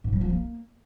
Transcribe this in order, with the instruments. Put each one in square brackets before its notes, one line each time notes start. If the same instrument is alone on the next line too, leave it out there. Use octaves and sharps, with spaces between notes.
[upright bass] G#2
G3
F3
A#3